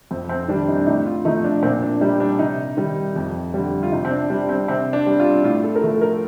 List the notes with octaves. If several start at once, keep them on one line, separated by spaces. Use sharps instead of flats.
F2 C4
C4
D#3 G3 D4
D#4
D4
A2 D#4
F4
F3 A3 D#4
D4
A#2 C4
D4
G3 D#4
D4
C3 D#4
D#3 G3
F2
D3 G3
F4
C3 D#4
C4
D4
G3 D4
C4
C3 C4
D4
G3
F4
A2 F4
A4
A#4
F3 A3 A4
A#4